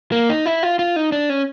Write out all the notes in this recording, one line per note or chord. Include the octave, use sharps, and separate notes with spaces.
A#3
D#4
E4
F4
F4
D#4
D4
C#4